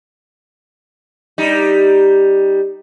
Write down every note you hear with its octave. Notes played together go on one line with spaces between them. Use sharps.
G3 D#4